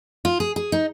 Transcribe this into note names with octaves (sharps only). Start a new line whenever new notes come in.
F4
G#4
G#4
D#4